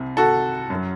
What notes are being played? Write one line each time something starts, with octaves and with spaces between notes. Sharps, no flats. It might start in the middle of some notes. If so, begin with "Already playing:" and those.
Already playing: C2 C3
F#4 A4
F#2
F#3